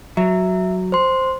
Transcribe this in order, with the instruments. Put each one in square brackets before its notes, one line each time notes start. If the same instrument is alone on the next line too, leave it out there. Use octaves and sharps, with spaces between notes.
[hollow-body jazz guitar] F#3 [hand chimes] E5
[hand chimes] C5 C6